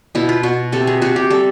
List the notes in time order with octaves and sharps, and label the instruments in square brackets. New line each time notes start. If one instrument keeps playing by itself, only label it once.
[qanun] B2 E4
F4
B2 F#4
C3 A4
G#4
C3 F#4
G4
G3 A4